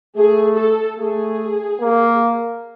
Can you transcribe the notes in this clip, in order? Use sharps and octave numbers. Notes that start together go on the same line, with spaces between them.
A3 G#4
A4
A3 G#4
A#3